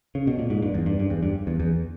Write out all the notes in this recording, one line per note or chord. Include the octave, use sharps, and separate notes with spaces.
C#3
B2
A#2
G#2
G2
E2
G2
G2
E2
G2
E2
E2